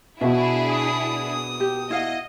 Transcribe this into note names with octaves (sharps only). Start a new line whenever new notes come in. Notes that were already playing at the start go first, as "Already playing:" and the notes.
B2 D4 E4 F#4 G#4 E5
D#6
G4
E4 D#5 F5 F#5